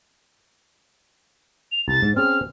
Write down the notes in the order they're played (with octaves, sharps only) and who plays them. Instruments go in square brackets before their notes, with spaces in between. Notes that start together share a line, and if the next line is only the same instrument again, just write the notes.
[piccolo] F7
[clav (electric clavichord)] C2 [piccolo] A6
[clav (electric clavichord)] G#2
[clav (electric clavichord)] C4 C#4 G#4 [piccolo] F6